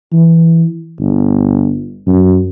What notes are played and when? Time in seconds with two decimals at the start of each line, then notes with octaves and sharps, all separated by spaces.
0.13 E3
1.00 G1
2.07 F#2